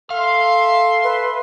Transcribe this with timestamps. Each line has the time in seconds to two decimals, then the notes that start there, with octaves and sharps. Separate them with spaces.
0.11 A4 E5 F5 C6
1.04 B4